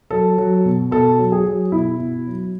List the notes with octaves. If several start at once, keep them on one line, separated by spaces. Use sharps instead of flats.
F#3 A4
F#3
B2
B2 A4
F#3
G#4
F#3
B2 E4
B2
F#3